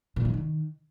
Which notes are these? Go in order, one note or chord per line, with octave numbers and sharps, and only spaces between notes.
A#2
E3
D#3